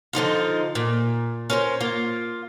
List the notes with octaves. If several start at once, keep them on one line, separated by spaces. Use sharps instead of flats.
D3 F3 D#4 F4
A#2
C#4 A#4 C5
A#3 F4